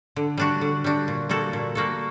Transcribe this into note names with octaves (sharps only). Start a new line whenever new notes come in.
D3
G3 D4 F#4
D3
G3 D4 F#4
A#2
G3 A#3 F#4 A4
A#2
G3 A#3 F#4 A4